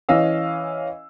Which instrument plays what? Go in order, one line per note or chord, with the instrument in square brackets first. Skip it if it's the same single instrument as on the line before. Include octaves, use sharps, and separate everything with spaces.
[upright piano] E3 C#4 D#5 F5 E6